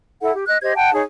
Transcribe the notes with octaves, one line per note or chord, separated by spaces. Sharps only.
E4 A4 F#5
G4
D#5 F#6
G4 C5 D#5 G#6
F#5 G5 A5
D#4 G#4 C#5